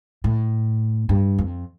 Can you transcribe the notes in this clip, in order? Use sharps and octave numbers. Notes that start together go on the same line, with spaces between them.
A2
G2
F2